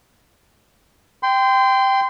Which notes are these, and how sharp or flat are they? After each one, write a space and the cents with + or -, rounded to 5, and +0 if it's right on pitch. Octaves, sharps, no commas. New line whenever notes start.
G5 +0 C6 -25